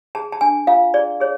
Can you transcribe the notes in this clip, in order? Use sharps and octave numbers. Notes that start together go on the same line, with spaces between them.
G#4 A5
A5
D4 G#5
F4 F5
G#4 D5
G#4 C#5